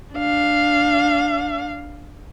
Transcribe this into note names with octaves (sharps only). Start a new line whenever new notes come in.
D4 F5